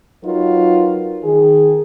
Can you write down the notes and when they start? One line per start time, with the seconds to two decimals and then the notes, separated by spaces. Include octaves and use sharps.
0.23 F#3 D#4 F4 A#4 B4
1.23 D#3 G#4